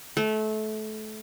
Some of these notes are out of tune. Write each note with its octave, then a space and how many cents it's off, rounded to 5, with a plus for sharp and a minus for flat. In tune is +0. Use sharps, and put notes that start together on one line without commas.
A3 -25